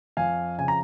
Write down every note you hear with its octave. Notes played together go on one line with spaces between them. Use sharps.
F2 F5 G#5
C#3 G#5
A#5